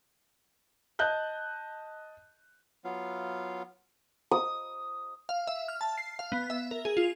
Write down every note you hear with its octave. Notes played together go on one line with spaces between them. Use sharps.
D#5 A5 F#6 G6
F#3 B3 F4 F5
D#6
F5
E5
F6
A5
C7
F5
B3
E5
A#4
G#4
F4